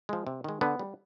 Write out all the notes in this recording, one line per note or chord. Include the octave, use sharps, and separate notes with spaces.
F3 G#3
C3
D#3 G#3
D3 B3
G3